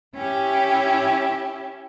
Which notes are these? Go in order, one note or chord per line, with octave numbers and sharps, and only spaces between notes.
C#4 E4 G4 E5